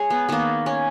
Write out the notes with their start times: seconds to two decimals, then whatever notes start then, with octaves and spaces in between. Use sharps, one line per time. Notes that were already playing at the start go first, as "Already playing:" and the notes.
Already playing: G#3 G#4 C#5
0.10 B3
0.29 D#3 A#3 B3
0.66 C#4